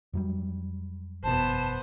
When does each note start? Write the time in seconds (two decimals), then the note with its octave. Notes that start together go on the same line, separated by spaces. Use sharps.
0.13 F2 F#3 G3
1.23 F#1 E2 B2 B3 C5 A5